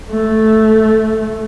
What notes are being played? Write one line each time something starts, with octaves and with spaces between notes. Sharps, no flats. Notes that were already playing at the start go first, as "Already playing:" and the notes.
A3